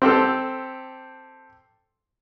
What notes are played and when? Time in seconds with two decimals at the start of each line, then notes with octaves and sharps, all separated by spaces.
0.02 C4 G4 A4